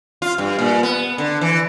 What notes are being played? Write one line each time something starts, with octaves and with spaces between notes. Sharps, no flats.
F4
G2
A#2
B3
D3
E3